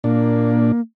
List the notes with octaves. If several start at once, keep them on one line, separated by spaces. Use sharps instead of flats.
A#2 A#3 D4